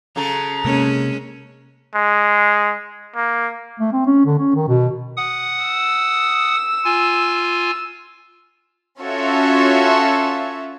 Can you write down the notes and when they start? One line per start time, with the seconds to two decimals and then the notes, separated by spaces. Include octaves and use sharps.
0.16 C#3 F#3 A4 A#5
0.65 C3 G#3 A#3 C#4
1.94 G#3
3.16 A#3
3.80 A3
3.93 C4
4.06 C#4
4.26 D3
4.38 C#4
4.55 D#3
4.68 B2
5.17 F#5 D#6
5.64 E6
6.85 F4 G#5
9.00 C#4 F4 F#4 A4 C#5 E5